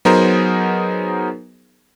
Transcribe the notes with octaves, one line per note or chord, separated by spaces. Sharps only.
F#3 B3 D#4 G#4 A#4 C5